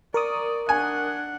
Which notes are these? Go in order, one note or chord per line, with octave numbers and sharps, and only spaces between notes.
A#4 D5 C#6 D#6
D4 F#5 G#5